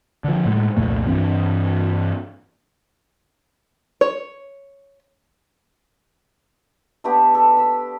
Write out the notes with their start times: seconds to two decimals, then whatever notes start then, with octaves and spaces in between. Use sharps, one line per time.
0.24 D3 F3
0.46 A2 G#3
0.77 C2 F2 A#2 A3
1.07 G2 E3 C4 D4
4.01 C#5
7.04 A3 B3 D4 G4
7.35 A4
7.57 B5 E6